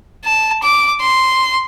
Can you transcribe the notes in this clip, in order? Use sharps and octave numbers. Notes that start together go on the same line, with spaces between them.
A5
D6
C6